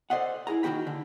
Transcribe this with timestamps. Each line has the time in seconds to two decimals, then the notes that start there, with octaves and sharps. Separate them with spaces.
0.10 A4 C5 D5 D#5 F#5
0.47 E4 G#4 A#5
0.63 D#2 D#3 D#4 F#4 G5 B5
0.87 D3